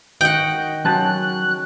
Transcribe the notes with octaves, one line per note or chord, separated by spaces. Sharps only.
D#3 F#4 D#5 F#5 G5
F#3 C#4 A5 F#6